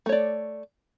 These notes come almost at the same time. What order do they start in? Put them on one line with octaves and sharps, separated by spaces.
A3 C#5 D5